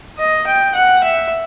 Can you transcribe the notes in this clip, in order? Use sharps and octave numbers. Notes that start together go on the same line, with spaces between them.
D#5
G5
F#5
E5